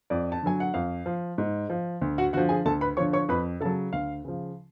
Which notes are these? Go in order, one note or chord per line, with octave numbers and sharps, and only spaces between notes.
F2 D5
A5
D3 F#3 G#5
F#5
F2 F5
F3
G#2
F3
D2
F#4 F#5
D3 F3 F#4 F#5
G#4 G#5
D2 A4 A5
B4 B5
D3 F3 C#5 C#6
C#5 C#6
F2 B4 B5
C#3 F#3 A4 A5
D2 F5
C#3 F3